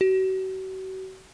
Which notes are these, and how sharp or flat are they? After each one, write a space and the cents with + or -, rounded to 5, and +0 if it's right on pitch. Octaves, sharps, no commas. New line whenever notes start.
F#4 +40